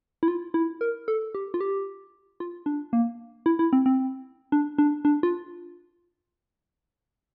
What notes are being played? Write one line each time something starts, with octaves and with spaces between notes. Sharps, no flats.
E4
F4
E4
A#4
A4
G4
F4
G4
F4
D4
A#3
E4
E4
C4
C4
D4
D4
D4
F4